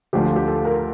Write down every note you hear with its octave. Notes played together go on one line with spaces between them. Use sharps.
D2 D3 F3 G4
F4
G4
A4
A#4